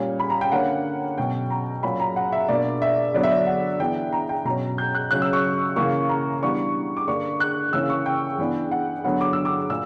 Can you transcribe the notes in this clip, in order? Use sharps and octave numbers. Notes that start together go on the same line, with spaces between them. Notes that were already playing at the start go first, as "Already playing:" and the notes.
Already playing: A#2 G3 C#4
B5
A#5
G5
D3 A#3 C#4 F#5
B2 F#3 C#4 G5
A#5
A#2 F#3 C#4 B5
A#5
F#5
E5
B2 A#3 D4 D5
E5
D3 F#3 B3 D4 D5
E5
D5
F#5
E3 B3 D4 G5
A#5
G5
B2 F#3 C#4 A#5
G6
F#6
C#3 F#3 C#4 F#6
E6
C#6
C#3 E3 A#3 C#6
A#5
E3 G3 B3 D4 C#6
D6
D3 A#3 D4 C#6
F#6
C#3 E3 A#3 C#4 E6
C#6
G5
E3 B3 D4
F#5
D3 F#3 B3 F#5
D6
E6
D6
A#2 E6